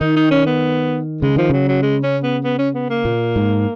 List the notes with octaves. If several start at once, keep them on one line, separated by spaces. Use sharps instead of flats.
D#3 D#4
D#4
C#4
B3
C#3 G#3
D#3 F3
C#3 F#3
F#3
G#3
C#4
B3
B3
C#4
B3
A#3
A#2
G#2